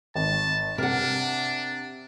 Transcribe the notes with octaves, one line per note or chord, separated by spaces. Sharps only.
G#1 A5
C3 D4 A#4 F#5